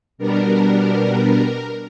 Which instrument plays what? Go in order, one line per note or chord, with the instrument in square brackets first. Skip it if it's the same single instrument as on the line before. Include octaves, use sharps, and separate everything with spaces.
[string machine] B2 G3 B3 D4 A#4